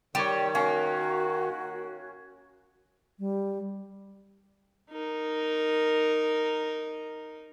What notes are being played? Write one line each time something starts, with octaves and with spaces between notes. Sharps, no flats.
D#3 G3 C#5 D6
A#3 C#4 F#4
G3
D#4 A#4